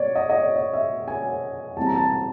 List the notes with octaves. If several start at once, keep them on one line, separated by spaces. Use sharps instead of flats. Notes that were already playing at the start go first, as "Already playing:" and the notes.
Already playing: B2 C#5 D5
D#5
D#5
D5
D#5
E5
G#5
E2 B2 G3 C4 A5
A#5
A5